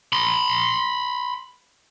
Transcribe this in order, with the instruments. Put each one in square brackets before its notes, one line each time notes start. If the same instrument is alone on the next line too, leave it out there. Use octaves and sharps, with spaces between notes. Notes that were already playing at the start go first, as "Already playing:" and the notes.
[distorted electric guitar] B5 C6